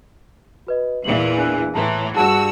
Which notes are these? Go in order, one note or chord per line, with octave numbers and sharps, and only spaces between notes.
F#4 B4 D#5
E2 A#2 E3 F#7
D4 G#5 F#6
A2 E3 A5 A#5 C6
G2 F#4 G#4 A5 E6